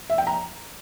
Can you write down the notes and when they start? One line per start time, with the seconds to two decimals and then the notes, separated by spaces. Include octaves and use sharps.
0.10 E5
0.18 G5
0.27 A#5